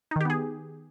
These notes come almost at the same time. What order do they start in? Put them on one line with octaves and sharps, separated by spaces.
D#4 D#3 G4 B3 G#4